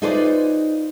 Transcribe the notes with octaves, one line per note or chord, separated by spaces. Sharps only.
D#4 F4 G#4 B4 C5 D5